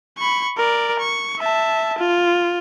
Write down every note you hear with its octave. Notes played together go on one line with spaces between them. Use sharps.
B5 C#6
A#4 D5
C#6
E5 A5
F4